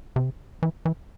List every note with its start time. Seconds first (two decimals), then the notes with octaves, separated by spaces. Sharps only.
0.16 C3
0.63 E3
0.85 E3